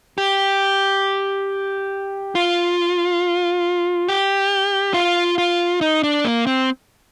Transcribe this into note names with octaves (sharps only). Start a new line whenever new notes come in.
G4
F4
G4
F4
F4
D#4
D4
A#3
C4